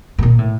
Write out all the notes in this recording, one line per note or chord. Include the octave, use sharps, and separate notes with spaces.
A2
A#2
A2